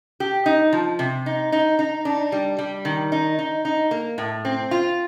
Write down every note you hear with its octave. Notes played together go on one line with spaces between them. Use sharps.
G4
D#4
F3
C3
D#4
D#4
D#4
D4
G3
G3
D#3
D#4
D#4
D#4
A#3
A2
C4
F4